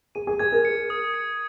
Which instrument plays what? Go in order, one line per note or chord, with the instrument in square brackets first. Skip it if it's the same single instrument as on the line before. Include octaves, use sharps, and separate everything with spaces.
[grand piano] G#4 [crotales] D#7
[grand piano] G#4
[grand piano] G#4 [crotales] G#6
[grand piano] A#4
[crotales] C#7
D#6
C#7